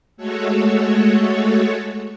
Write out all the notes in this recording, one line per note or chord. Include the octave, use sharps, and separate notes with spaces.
G#3 A3 F#4 A4 C#5